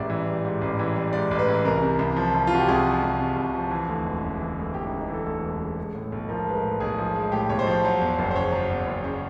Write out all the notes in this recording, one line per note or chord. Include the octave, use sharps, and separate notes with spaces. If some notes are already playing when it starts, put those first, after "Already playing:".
Already playing: A1 G#2 G3 D5 E5
E3
G3
G#2
A1
E3
G3
G#2 D5
A1
B4
E3
C2 A#4
C3
C2
F3
C2
F4
C3 F#4
G4
C2 G#4
F3
C2
C3
C2
F3
E3
D2
E1
C#3
E3
D2
E1 G4
D#4
C#3
D#4
E3
A4
D2 A4
E1
C#3
G#3
A2
B1
F3 A#4
G#3 B4
A#4
A2
B1 G#4
F3
G#3
A2 G4
B1 C#5
C5
F3
F#3
E2
F#1
C5
C#3 C#5
F#3
E2
F#1
C#3